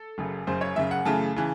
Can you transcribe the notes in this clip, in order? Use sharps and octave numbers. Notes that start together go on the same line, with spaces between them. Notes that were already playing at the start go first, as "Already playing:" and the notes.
Already playing: A4
F#1 F#2 C#3
F#1 F#2 C#3 C5
C#5
F#1 F#2 C#3 E5
F#5
F#2 C#3 E3 A3 A5
C#3 E3